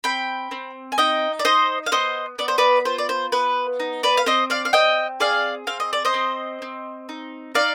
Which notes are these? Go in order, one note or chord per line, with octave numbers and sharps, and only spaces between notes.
C4 G5 B5
C4
G#5
D#4 D#5 G5
D5
D#4 C5 D#5
F5
B3 C5 D#5
B3 D5
C5
B4 D5
F4 C5
D5
C5
B3 B4
D#4
B4 D5
F5
C4 C5 D#5
D5 F5
F5
C4 D#5 G5
G#4 D5 F5
C4 F5
D#5
D5
C5 D#5
C4
C4
D#4
D#4 D5 F5